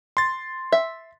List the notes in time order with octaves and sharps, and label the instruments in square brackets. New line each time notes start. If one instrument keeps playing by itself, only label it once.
[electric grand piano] C6 A6
[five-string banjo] E5